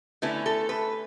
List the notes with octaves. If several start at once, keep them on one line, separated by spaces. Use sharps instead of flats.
D3 A3 C#4 E4 B4
A4
B4